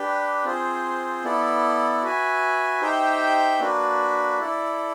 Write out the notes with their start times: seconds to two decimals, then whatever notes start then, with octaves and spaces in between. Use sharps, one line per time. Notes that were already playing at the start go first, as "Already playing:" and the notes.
Already playing: D4 G4 B4
0.45 C4 F4 G#4 C5
1.24 B3 E4 A4 D5
2.02 F#4 B4 E5 G#5
2.81 D#4 G4 C5 E5 G5
3.60 A#3 D4 F#4 B4
4.39 E4 A4 D5